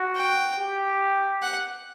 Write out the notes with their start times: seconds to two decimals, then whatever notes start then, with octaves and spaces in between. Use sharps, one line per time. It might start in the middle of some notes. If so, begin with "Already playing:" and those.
Already playing: F#4
0.16 G5
0.58 G4
1.42 F#5